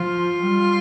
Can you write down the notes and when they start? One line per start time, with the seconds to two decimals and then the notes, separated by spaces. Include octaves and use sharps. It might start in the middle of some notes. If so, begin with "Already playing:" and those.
Already playing: F3 F4
0.44 G3